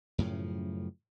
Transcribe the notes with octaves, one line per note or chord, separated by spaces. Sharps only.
F#2 A2 C#3 F3